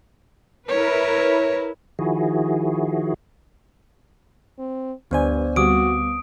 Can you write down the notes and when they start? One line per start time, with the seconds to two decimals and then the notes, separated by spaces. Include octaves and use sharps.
0.69 E4 A#4 B4 C#5
1.99 D#3 F3 E4 F#4 G#4
4.59 C4
5.11 D2 G2 B3 D4 C5 D5 G#5
5.56 D2 G3 B3 C4 F#4 D6 D#6 D7